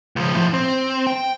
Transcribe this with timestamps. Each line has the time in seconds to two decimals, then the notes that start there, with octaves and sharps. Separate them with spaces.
0.16 C#2 F3
0.34 A2 F3
0.54 C4
1.07 G5